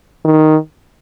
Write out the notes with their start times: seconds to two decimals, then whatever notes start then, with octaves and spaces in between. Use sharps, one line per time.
0.25 D#3